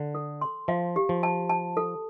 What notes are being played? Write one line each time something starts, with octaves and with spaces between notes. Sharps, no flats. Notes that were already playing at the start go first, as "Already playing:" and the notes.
Already playing: D3
A4
C6
F3 F5
G4
F3
A5
A5
A4